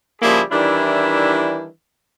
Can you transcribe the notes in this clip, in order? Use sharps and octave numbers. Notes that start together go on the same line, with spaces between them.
C#3 F3 G3 A#3 E4 G#4
D#3 E3 G3 D4 E4